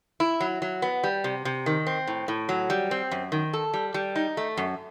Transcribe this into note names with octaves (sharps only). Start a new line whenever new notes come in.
E4
F#3
F#3
B3
G3
C3
C3
D#3
C4
A2
A2
F#3
G3
C4
F#2
D#3
A4
G3
G3
D#4
A3
F#2